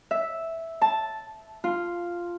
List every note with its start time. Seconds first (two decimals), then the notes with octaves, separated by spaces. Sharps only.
0.11 E5
0.82 A5
1.64 F4